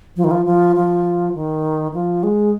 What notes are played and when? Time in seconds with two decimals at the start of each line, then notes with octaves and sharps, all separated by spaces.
0.16 F3
0.24 D#3
0.31 F3
0.46 F3
0.76 F3
1.35 D#3
1.94 F3
2.23 G#3